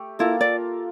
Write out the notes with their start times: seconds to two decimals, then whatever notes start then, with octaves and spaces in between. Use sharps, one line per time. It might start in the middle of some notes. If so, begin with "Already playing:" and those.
Already playing: A3 G4
0.19 A#3 E4 F4 A4
0.41 D5